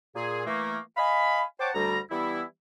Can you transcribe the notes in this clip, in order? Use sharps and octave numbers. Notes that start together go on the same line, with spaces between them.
A#2 G#4
E3 A3 A#3
D#5 F5 G#5 B5
C5 C#5 F#5 G5 A5 D6
D2 G3 A#5
E3 G3 B3 E4